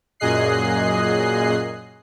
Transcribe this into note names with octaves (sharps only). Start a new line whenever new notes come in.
F#2 A#2 G#4 D#5 F#6 C7